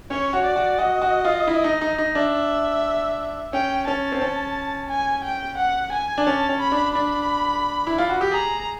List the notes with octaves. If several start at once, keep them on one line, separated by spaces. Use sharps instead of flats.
C#4 C#5
F#4
D5
F#4
F#4 D#5
F#4
F4
E4
D#4
D#4
D#4
D4 E5
C#4 G5
C#4 A5
C4
C#4
G#5
G5
F#5
G#5
D4
C#4 A5
C#4
B5
D4
D4 B5
E4
F4
F#4
G4
G#4 A#5